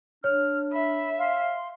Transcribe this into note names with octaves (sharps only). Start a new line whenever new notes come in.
D4 C#5 F6
E5 B5
F5 C6